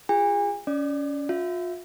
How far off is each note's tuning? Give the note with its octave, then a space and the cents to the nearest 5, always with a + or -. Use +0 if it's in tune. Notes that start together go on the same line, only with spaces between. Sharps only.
F4 +0 G#4 -25 G#5 -40
C#4 +30 D5 +20
F4 +35 E5 +5